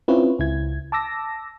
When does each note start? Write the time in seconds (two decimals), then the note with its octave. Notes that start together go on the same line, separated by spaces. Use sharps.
0.08 C4 C#4 E4 F4 B4 C#5
0.39 C#2 E4 G#6
0.92 A5 D6 E6 A#6